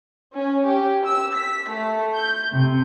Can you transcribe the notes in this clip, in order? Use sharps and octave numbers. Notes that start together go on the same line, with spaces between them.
C#4
G4
E6
B6
A3
G6
C3